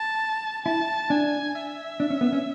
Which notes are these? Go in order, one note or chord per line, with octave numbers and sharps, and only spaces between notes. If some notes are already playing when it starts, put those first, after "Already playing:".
Already playing: A5
E4 A5
D4 G#5
E5
D4
C#4
B3
C#4